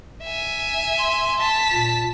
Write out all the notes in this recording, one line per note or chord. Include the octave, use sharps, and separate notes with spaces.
E5 G#5
C6
A5 B6
A#2